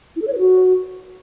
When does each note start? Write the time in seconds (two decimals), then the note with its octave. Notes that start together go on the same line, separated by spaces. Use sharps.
0.16 E4
0.22 A4
0.27 C#5
0.33 B4
0.39 F#4